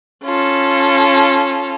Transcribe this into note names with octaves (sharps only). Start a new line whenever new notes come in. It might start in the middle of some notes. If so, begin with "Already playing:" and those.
C#4 F4 A4